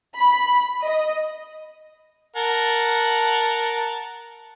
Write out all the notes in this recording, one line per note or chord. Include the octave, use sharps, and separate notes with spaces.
B5
D#5
A#4 F#5 A5